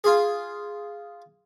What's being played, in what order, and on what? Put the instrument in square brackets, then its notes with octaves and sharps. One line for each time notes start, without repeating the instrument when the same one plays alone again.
[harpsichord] F4 G#4